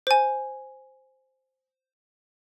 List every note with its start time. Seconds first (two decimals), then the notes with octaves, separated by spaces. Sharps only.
0.07 C5 G#5